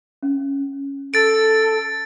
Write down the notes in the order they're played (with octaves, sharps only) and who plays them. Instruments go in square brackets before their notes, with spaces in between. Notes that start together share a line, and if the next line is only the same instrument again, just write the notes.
[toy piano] C#4
[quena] A4 [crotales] A6 D7